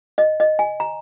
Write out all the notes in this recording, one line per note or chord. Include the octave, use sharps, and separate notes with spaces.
D#5
D#5
G#5
A#5